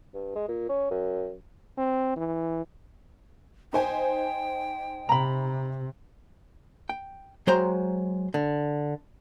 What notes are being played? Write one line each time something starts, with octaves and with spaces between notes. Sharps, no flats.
G2
G#3
A#2
C#4
F#2
C4
E3
D#4 C5 G5 G#5
C3 A#5 B5
G5
F#3 G#3 C5 G5 A#5 C6
D3